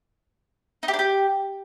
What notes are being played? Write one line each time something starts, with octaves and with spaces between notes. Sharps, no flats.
D#4
G4
D4
G4